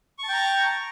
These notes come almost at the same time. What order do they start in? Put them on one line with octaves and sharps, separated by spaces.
C#6 A5 G5 A#5